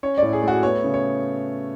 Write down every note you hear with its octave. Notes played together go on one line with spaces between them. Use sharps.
C#4 C#5
A2 D5
G#4
A3
F#4
B3 C#5
C#3
C#5